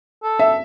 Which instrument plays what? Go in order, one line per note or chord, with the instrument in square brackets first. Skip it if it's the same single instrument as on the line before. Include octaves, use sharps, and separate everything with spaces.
[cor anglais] A4
[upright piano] E5